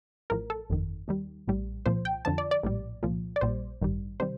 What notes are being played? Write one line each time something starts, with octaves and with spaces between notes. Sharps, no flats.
A1 A2 F3 A#4
A4
G1 F2 D#3
D#2 D#3 G3
A#1 A2 G3
C2 A#2 F3 C5
G5
F2 D3 F3 A5
D5
D5
A#1 A2 G3
C2 A#2 F3
D5
A#1 A#2 G3 C5
A1 G2 D#3 G3
C3 D#3 G3 C5